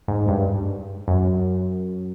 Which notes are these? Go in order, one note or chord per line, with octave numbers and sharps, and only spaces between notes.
G#2
G2
F#2